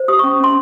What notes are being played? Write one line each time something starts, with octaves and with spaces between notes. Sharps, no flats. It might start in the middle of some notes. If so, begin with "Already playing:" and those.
Already playing: C5
G4 D#6
C#6
C#4
C#4 C6